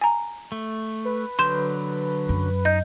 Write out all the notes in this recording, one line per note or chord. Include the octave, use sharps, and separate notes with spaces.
G#5 A#5
A3
B4
D3 F#3 C6 G6 E7
F#2
D#4 D#5 G6